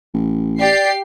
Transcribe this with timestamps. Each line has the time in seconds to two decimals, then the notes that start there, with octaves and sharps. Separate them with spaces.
0.14 A1
0.60 G4 D5 C7